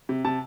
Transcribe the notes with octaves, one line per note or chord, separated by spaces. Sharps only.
C3
C3 A5